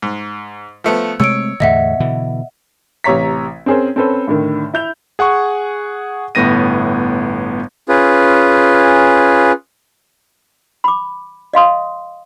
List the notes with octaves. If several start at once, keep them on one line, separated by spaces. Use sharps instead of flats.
G#2
F3 A3 B3
C3 G#3 A3 C#5 E6 D7
E2 A2 D3 D#5 E5 F#5
B2 D3 E3
A1 C3 C#5 A#5 B6
C4 C#4 G#4 A#4 C5
C4 C#4 A4 B4 C5
A2 D3 D#3
E4 G6 F7
G#4 F#5 G#5 C#6
G1 A2 B3 A#6 D#7
C#4 F4 G#4 B4
B5 D6
D#5 F5 C6 D#6